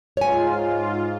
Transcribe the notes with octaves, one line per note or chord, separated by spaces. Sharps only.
G#2 F4 C#5 G#5